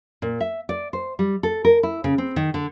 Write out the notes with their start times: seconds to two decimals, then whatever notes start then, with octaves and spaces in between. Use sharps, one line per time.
0.22 A#2
0.40 E5
0.69 D5
0.93 C5
1.19 G3
1.43 A4
1.65 A#4
1.83 E4
2.04 C#3
2.18 C4
2.36 D#3
2.54 D3